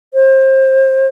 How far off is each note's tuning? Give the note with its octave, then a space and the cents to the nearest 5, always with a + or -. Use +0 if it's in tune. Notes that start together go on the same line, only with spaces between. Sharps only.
C5 +30